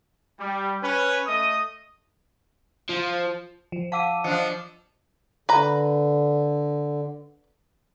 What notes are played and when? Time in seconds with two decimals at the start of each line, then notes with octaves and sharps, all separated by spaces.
0.38 G3
0.82 C#4 B4
1.26 A3 D#5 D#6
2.89 F3
3.72 F3
3.92 F5 F#5 A5 D6 E6 D#7
4.24 F3 D4 D#5 C#7
5.49 D3 B4 A#5